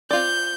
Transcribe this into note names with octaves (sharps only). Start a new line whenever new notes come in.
C4 F4 D5 G6